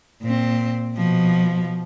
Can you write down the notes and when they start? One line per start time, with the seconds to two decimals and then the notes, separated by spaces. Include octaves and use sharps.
0.23 A#2 C4
0.97 B2 F3